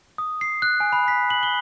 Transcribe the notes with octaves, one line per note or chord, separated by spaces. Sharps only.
D#6
C7
F#6
G#5
B5
B6
F#7
G7